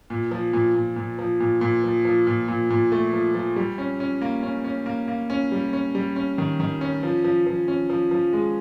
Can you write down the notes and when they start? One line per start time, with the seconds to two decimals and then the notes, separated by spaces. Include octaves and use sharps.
0.10 A#2
0.31 F3
0.53 A#2
0.75 A#2
0.96 A#2
1.19 F3
1.40 A#2
1.61 A#2
1.84 F3
2.05 F3
2.27 A#2
2.48 A#2
2.70 A#2
2.92 A3
3.13 F3
3.35 F3
3.56 G3
3.78 C#4
4.00 C#4
4.21 A#3
4.43 C#4
4.64 C#4
4.86 A#3
5.08 A#3
5.30 C#4
5.52 G3
5.73 C#4
5.95 G3
6.16 C#4
6.38 D#3
6.60 D#3
6.81 C#4
7.03 F3
7.24 F3
7.47 F3
7.68 C#4
7.90 F3
8.11 F3
8.33 G#3